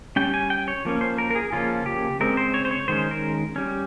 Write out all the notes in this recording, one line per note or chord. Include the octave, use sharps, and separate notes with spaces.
G3 C#4 G5
G#5
G5
C#5
F3 A#3 C#4
C5
A#4
A#4
G#4
C#3 F3 A#3 C#4 F4
G4
C#3 G#3 C4 A#4
C5
C#5
C5
C#5
D#3 G#3 C#4 C5
A#4
G3 C#4